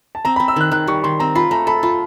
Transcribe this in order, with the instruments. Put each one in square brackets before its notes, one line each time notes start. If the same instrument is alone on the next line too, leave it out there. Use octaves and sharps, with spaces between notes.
[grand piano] A5
[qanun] C4 [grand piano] A#5
[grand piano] B5
[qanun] C4
[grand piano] E6
[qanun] D#3 [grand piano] F#6
[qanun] D#3 [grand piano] F#6
[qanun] G3 [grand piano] C#6
[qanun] D#3 [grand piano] C6
[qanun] C4 [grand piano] A#5
[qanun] F4 [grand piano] B5
[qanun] A3 [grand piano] A#5
[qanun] A4 [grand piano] B5
[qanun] F4 [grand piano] B5